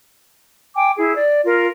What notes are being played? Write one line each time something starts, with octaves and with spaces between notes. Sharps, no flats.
G5 G#5 D6
E4 G#4
D5
F4 A#4